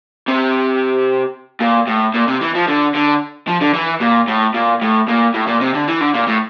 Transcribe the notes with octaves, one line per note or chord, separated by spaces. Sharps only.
C3
A#2
A2
A#2
C3
E3
F3
D3
D3
F3
D3
E3
A#2
A2
A#2
A2
A#2
A2
A#2
C3
D3
E3
D3
A#2
A2